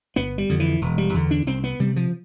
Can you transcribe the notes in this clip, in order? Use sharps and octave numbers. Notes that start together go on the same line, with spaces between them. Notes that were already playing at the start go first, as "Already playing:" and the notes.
G1 B3
G3
F2 D3
E3
E1
G3
E2 D3
D4
C2 C4
B3
C3 G3
F3